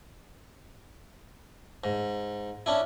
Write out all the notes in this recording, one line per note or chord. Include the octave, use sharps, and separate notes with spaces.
G#2
C#4 D4 E4